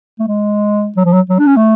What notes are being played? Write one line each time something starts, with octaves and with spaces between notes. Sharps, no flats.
A3
G#3
F#3
F3
F#3
F#3
D4
C#4
A3